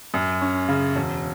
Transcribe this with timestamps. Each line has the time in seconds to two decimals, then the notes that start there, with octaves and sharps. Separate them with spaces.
0.14 F#2
0.41 C#4
0.69 C#3
0.96 E1